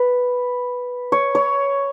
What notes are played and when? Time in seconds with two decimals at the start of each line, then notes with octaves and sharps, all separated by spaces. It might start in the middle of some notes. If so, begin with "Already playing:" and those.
Already playing: B4
1.12 C#5
1.35 C#5